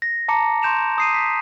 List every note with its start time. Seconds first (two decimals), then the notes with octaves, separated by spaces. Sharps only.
0.02 A#6
0.28 A5 A#5 D6 C#7
0.62 C6 C#6 G6 D7 E7 F7
0.98 D#6 C7 D#7
1.14 B6